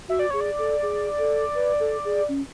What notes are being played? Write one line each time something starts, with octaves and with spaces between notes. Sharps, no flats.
F#4 E5
D5
G#4 C#5
D5
A4
G#4
A4
B4
A4
G#4
C#4